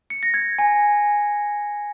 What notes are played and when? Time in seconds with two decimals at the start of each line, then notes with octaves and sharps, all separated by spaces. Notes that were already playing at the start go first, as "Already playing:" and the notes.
0.10 C#7
0.23 A#6
0.34 G#6
0.59 G#5